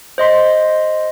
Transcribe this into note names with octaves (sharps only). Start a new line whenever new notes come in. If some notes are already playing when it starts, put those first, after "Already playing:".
C5 D#5 C6 B6